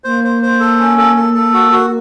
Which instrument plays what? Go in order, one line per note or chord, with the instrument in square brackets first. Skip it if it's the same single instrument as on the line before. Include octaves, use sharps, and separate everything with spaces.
[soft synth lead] A#3 [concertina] C5
[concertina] C5
C5
A4
C#4
A4
A4
A4
F#4
F#4